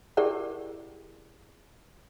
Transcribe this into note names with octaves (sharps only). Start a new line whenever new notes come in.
E4 G4 G#4 A#4 D5 F#5